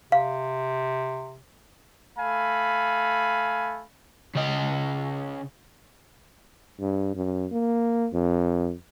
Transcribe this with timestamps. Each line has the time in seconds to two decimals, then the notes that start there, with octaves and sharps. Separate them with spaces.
0.12 C3 F5
2.18 A3 F5 G#5 B5
4.35 C#3 D#5
6.80 G2
7.15 F#2
7.52 A#3
8.13 F2